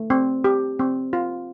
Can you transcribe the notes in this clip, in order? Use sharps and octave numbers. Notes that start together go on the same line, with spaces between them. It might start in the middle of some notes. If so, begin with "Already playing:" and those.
Already playing: A3
C4
G4
C4
F4